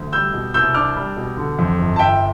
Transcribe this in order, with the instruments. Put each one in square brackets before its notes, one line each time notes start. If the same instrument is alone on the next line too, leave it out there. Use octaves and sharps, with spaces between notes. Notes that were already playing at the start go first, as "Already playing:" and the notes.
Already playing: [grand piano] D2
G3 E6 G6
B2
C2 E6 G6
D4 D6 F6
G3
B2
D3
F2
G1
A5
G1 E5 G5